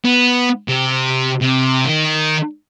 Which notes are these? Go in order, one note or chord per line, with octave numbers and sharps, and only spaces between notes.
B3
C3
C3
D#3